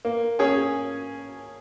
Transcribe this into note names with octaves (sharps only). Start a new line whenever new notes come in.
A#3
C#4 G#4 C#5